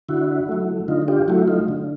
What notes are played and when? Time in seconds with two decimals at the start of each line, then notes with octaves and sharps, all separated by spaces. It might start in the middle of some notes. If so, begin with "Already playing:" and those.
0.09 D3 E4 F#4
0.49 F#3 A3
0.88 D3 D#4 F4
1.08 F4 G4
1.28 F#3 A3 E4 F#4
1.47 D#4 F4
1.68 D3